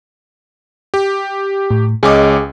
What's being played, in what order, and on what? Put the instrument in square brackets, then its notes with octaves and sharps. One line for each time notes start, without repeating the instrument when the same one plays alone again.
[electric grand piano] G4
[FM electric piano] A2
[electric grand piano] C#2 C#4 D6 [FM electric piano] G#4 D#5